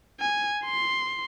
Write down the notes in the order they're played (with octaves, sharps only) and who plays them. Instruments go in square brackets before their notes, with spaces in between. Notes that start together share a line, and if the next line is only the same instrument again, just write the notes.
[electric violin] G#5
C6